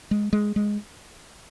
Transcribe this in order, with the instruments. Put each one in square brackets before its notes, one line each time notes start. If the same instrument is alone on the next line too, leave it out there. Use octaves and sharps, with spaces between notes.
[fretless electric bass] G#3
G#3
G#3